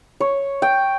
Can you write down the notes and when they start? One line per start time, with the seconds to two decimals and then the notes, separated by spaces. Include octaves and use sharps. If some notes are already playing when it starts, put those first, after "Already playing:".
0.20 C#5
0.62 G5